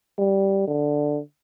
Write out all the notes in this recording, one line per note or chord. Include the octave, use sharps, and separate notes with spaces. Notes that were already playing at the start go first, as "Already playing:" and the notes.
G3
D3